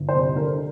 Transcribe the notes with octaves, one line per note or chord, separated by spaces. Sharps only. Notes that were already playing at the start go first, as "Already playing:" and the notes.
Already playing: G1
C5
C3
D3 A#4